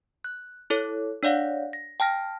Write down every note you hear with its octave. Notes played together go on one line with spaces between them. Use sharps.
F#6
E4 A4 C#5
D4 C#5 D5 F5 F#5
A#6
G5 A5 F6 A#6